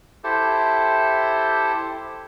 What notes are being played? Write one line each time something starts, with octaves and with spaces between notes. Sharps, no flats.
E4 G4 A4 C5 E5